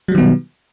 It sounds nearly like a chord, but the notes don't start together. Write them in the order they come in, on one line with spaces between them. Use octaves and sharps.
F#3 G3 D#3 B3 B2